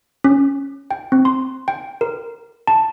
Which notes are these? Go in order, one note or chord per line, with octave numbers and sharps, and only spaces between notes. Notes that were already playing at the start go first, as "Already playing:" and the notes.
C#4
G5
C4
C6
G5
A#4
A5